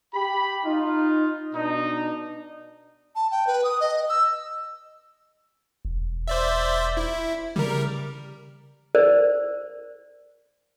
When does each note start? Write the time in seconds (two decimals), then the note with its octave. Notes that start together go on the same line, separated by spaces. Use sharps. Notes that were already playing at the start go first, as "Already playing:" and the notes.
0.14 G4 B5
0.64 D#4 F4
1.54 B2 D4 D#4
3.16 A5
3.31 G5
3.47 B4
3.64 D#6
3.80 D#5
4.09 E6
5.85 E1
6.28 C5 D5 E5
6.97 E4
7.56 C#3 G3 A#4
8.95 A#4 C5 D5